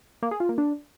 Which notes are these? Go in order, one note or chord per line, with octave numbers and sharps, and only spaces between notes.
A#3
G#4
F4
A#3
D4